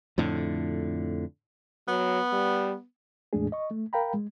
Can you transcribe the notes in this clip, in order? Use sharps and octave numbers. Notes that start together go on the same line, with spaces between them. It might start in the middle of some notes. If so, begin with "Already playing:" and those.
F2 A2 D3
F#3 B3
G3
E2 A2 G#3 A3 D4 G#4
D#5 C#6
A3
A#4 F5 G5 A#5 B5
G#3